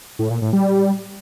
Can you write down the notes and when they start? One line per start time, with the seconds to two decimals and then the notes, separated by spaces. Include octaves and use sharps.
0.19 A2
0.30 A#2
0.42 A2
0.53 G3